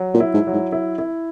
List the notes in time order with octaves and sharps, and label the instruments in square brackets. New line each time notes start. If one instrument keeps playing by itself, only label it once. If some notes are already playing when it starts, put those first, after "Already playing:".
Already playing: [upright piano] F#3
[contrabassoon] A#2
[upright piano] E4
[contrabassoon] G#2
[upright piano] F#3
[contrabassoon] G#2
[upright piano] E4
E4